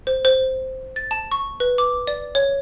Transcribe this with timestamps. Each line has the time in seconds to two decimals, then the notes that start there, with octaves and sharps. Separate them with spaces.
0.07 C5
0.25 C5
0.96 A6
1.11 A5
1.32 C#6
1.60 B4
1.78 D6
2.07 D5
2.35 C#5